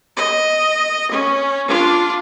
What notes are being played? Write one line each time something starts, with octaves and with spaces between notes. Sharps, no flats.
D#5
C#4
D4 F4